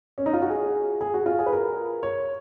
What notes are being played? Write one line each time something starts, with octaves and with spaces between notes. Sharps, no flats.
C#4
D#4
F4
F#4
G#4
G#4
F#4
F4
G#4
B4
A#4
C#5